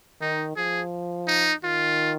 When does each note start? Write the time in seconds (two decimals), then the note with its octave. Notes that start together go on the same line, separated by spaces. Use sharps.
0.21 D#3 D#4
0.57 F3 G#4
1.28 D#4
1.63 D#3 F4